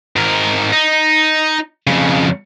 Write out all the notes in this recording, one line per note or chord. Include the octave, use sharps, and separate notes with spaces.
G#2 A#4
D#4
F2 C#3